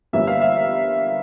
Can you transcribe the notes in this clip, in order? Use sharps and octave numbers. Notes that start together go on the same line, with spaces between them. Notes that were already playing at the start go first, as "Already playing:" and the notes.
G1 G2 E3 A#3 E5
F5
E5